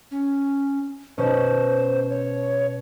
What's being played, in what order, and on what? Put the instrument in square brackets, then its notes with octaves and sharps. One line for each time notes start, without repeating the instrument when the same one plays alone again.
[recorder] C#4
[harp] B2 C#4 [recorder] C5
[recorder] C#5